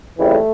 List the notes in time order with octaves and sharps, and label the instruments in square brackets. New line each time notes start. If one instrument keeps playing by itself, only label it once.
[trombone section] F2 C#3 E3 G3 A3